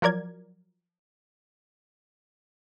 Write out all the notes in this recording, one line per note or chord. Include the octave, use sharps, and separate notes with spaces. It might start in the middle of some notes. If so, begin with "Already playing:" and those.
F3 F#3 A#4 D5 G#6